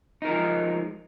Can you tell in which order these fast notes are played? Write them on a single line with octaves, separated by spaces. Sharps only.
D#4 A#4 F3 G#3